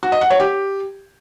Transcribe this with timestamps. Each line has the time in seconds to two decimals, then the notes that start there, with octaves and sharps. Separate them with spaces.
0.03 F#4
0.12 D#5
0.21 F#5
0.30 C#5
0.40 G4